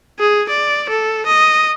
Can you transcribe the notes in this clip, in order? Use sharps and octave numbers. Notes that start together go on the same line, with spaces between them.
G#4
D5
A4
D#5